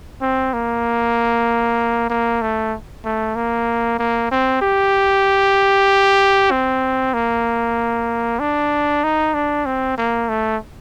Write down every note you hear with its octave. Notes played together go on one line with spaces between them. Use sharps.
C4
A#3
A#3
A3
A3
A#3
A#3
C4
G4
C4
A#3
D4
D#4
D4
C4
A#3
A3